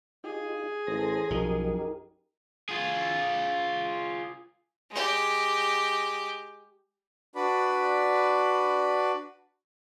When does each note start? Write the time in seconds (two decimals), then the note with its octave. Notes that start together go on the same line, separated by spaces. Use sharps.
0.24 D#4 F4 G4 G#4
0.87 A1 A4 C5 A#6
1.31 B1 F#2 F3 D#4 G4 A#4
2.69 F4 G#4
4.91 G#3 G4
7.36 D4 F#4 B4 D5 B5